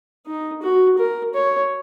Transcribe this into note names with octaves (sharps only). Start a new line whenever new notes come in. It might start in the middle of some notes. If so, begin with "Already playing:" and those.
D#4
F#4
A#4
C#5